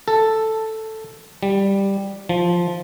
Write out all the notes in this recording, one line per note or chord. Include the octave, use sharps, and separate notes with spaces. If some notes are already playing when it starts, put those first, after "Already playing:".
A4
G3
F3